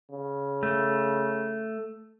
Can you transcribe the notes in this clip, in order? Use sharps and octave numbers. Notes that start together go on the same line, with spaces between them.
C#3
A3